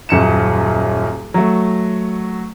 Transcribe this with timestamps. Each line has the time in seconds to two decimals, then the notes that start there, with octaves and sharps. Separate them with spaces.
0.09 D#1 F#2 C#7 E7
1.34 F#3 A3